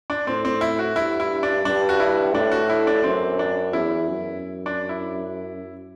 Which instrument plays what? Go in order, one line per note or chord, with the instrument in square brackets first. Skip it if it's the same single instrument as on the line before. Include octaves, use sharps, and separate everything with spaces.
[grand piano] D4
[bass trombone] A2 [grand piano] C4
[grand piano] C4
E4
F#4
[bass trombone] G2 [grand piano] E4
[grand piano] E4
D4
[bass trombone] G2 [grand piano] D4
[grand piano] F#4
E4
[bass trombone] A2 [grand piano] D4
[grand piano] F#4
E4
D4
[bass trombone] F#2 [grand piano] C4
[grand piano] D4
[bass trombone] E2 [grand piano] E4
[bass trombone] F#2
[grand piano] D4
E4